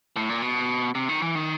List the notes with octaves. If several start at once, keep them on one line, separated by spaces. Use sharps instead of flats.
A2
A#2
B2
C3
D#3
E3
D#3